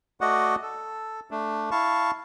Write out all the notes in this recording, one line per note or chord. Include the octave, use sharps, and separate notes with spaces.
A3 F#4 D5 D#5 F#5
A4
A3 D4
E4 F5 A5 C#6